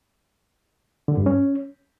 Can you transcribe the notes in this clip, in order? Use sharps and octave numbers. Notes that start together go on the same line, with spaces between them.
D3
G2
C#4